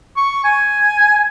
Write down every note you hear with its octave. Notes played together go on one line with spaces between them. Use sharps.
C#6
G#5